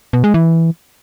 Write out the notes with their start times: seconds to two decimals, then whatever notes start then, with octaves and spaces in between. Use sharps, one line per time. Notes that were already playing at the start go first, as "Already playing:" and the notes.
0.13 B2
0.24 G#3
0.34 E3